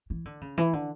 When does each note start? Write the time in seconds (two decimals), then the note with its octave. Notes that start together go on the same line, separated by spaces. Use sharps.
0.10 E3
0.25 D3
0.41 C#3
0.58 E3
0.73 D3